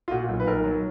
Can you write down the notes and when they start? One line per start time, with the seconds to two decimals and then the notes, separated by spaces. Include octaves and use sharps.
0.08 F4
0.11 A#2 F#4
0.29 B1
0.40 B4
0.47 B1 A#4
0.64 F#3